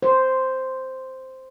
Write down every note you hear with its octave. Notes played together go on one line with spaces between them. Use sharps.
C5